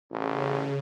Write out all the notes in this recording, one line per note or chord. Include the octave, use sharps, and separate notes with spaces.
A1 C#3